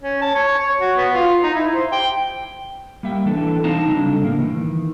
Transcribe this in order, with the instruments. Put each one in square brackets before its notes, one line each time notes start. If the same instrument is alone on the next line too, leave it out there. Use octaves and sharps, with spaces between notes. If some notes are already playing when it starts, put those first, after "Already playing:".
[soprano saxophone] C#4
A5
C#5
C#5
F#4
B3
F4
D#4
E4
C5
G5
[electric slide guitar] G3 A#3 E5 G5
E3 D4 A4
C4 D#4 D#5 F5 A5 A#5
C#3 F#3 G3 D4 A4
A2 A#3
D#3 E3